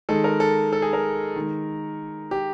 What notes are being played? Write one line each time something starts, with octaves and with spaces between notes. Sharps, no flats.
D#3 G#3 A4
A#4
A4
A4
G#4
A#4
D#3 G#3
G4